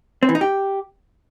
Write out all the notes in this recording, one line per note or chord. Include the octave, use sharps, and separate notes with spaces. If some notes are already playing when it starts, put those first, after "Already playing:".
C4
E3
D#4
G4